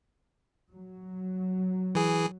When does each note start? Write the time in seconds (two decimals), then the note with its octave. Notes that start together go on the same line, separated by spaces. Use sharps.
0.71 F#3
1.95 E3 G#4